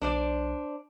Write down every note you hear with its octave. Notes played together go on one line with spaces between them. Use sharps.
B1 D4 C5 D5